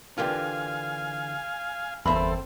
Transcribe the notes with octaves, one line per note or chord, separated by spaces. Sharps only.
D3 E3 D4 F4 G4 A#4 F5 G#5
G1 E2 A#3 C4 A4 C5 E5 B5